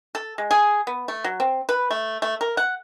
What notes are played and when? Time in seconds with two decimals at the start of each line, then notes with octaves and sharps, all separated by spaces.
0.15 A4
0.38 G#3
0.51 G#4
0.87 B3
1.08 A3
1.24 F#3
1.40 C4
1.69 B4
1.91 A3
2.22 A3
2.41 A#4
2.57 F#5